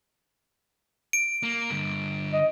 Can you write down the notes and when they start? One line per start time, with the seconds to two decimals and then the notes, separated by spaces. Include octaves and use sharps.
1.13 D7
1.43 A#3
1.71 G2 D3
2.32 D#5